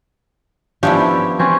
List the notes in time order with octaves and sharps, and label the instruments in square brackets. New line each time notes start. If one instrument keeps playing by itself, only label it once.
[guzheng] F3 B3 E4 [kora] C#4 D4 G4
[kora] C4 C#4 B4